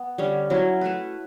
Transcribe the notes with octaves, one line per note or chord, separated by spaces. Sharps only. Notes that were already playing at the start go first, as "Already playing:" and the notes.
Already playing: B3
D3 G3 C#4
F#3 C#4 E4
A3 E4 B4